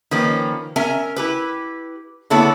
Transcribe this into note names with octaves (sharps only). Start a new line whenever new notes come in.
D#3 F3 A#3 C#4 B4
C#4 A#4 E5 G#5
E4 G4 B4
D3 A#3 B3 E4 A4 C#5